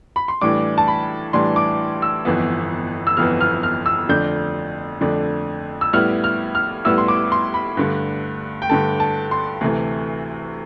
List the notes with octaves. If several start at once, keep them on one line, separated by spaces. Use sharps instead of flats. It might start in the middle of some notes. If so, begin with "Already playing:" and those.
B5
C6
A2 E3 G3 D4 D6
A5
B5
A2 E3 G3 D4 C6
D6
E6
G1 F2 E3 B3
E6
G1 F2 E3 B3 F6
F6
F6
E6
F2 D3 A3 D4 G6
F2 D3 A3 D4
E6
A2 G3 B3 E4 F6
F6
F6
A2 G3 B3 E4 E6
C6
D6
C6
B5
G2 D3 A3
G5
G2 D3 A3 A5
A5
C6
D2 C3 E3 A3